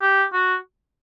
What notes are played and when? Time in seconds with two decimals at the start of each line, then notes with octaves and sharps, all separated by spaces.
0.02 G4
0.33 F#4